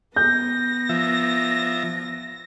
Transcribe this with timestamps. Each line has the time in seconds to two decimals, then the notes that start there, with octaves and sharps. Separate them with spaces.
0.16 B3 G6 A#6
0.89 F3 E5